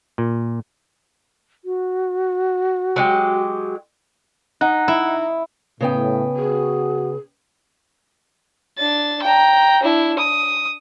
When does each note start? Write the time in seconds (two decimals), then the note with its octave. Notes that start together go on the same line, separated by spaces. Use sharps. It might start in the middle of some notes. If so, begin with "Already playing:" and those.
0.18 A#2
1.65 F#4
2.96 F#3 G#3 G4
4.61 D#4 F#5 F#6
4.88 E4
5.81 A2 C#3 B3 G5
6.36 F#4 G#4
8.78 D4 A6
9.22 G5 A#5
9.83 D4 E4
10.19 D#6